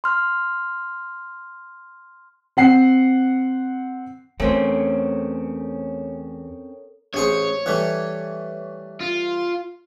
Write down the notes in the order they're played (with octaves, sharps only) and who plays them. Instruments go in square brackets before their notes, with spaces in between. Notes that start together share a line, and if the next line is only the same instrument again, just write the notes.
[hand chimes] C6 F6
[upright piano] C4 F#5 C7
[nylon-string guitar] E2 C5 [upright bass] A3 [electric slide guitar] C4 C#4 [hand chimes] A4 A#4 C#5
[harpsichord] A1 G#4 C5 [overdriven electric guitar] C#5
[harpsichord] E3 G3 A3
[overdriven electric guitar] F4